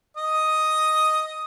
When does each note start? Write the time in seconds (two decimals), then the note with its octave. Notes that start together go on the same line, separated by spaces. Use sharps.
0.17 D#5 D#6